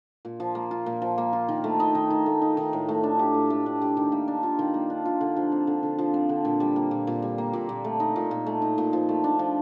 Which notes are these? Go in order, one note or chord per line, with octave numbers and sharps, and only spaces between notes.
A#2
F3
A#3
F4
A#2
F3
A#3
F4
D#3
A3
D#4
D#3
D#3
A3
D#4
D#3
A2
A3
D4
G4
A2
A3
D4
G4
D#3
A#3
D4
F4
D#3
A#3
D4
F4
D3
F3
C4
D3
D3
F3
C4
D3
A#2
G3
A#3
A#2
A#2
G3
A#3
A#2
A#2
A3
D#4
A#2
A#2
A3
D#4
A#2
F3
A3
D4
F3